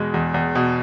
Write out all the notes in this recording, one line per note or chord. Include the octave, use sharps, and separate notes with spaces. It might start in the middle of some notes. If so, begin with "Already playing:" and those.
Already playing: E2 B2 G#3
E2
E2
B2